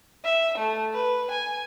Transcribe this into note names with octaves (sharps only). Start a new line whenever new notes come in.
E5
A3
B4
G#5